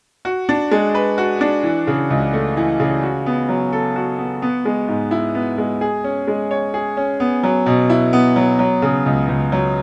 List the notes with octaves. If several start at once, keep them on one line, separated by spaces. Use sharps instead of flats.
F#4
D4
G#3
B4
F#4
D4
E3
C#3
C#2
A3
E3
C#3
F#4
B3
F#3
A4
F#4
B3
B3
G#3
G#2
E4
B3
G#3
G#4
C#4
G#3
C#5
G#4
C#4
B3
F#3
B2
E4
B3
F#3
F#3
C#3
C#2
C#2
F#3